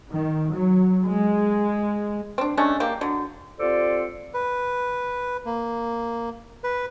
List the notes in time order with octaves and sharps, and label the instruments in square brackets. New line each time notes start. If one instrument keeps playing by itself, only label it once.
[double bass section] D#3
F#3
G#3
[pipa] C4 D4
G#3 A3 C#4 D4
A#3 G4
D3 F#3
[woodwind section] C4 F4 G4 A4 C5 D5
[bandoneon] B4
A#3
B4